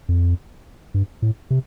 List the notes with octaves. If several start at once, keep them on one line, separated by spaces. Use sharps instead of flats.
F2
G2
A2
C3